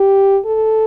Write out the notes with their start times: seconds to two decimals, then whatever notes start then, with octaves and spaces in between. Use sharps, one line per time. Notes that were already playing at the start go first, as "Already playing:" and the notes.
Already playing: G4
0.45 A4